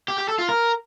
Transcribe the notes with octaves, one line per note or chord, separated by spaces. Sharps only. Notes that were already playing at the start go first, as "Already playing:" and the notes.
G4
G4
A4
F4
A#4